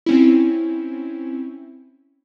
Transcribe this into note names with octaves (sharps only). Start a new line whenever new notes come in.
C4 C#4 E4